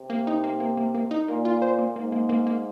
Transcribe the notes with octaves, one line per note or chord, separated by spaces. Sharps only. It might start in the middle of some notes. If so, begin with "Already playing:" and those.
Already playing: C3
A#3
D#4
A#3
A#3
A#3
A#3
D#4
A#2 A#3
F4
C5
A#3
G#2 A#3
A#3
A#3
A#3